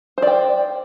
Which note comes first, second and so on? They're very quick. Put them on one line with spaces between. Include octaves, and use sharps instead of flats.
C5 D5 G5